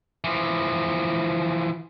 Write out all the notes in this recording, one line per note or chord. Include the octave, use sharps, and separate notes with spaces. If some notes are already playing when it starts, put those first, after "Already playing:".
E3 F3